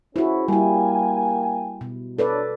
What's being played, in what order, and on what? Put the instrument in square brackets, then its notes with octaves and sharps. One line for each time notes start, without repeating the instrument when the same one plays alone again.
[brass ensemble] C#4 G#4 C5 [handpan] E4 F#4
[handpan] G3 E4 [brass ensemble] A#3 G5 G#5
[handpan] B2
[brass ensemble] D4 C#5 [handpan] A4 B4 D5